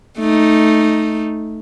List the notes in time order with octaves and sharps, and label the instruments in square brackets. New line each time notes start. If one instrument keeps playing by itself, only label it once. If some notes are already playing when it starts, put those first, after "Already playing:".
[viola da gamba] A3 D#4